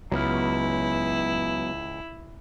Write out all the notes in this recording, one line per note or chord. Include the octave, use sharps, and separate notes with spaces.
C#2 F#3 B3 E4 F6